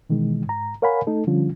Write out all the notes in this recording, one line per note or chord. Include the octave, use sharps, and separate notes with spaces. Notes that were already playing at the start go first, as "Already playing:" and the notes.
B2 D#3 E3 G#3 D#4
G#2 A#5
A#4 C#5 F5 F#5 G#5 B5
A3 D#4 A4
D3 F3 G3 C#4 F4